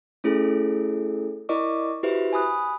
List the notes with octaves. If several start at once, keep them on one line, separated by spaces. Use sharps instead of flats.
A3 C#4 E4 G#4 A4
E4 A#4 D5 D#5 C#6 D6
E4 F#4 G4 B4 C5 E5
G#5 B5 D#6 F#6